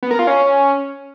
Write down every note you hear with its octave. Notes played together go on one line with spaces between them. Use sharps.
B3
A#4
F4
C#4